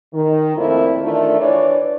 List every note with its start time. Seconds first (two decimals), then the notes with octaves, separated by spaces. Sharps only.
0.14 D#3
0.57 F2 A#2 A3 A#3 C4 E4
1.03 D#3 E3 A3 D4 F4
1.40 E3 D4 C#5 D5